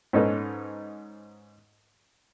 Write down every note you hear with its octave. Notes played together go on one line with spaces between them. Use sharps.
G#2 C#4 D#4 A4 B4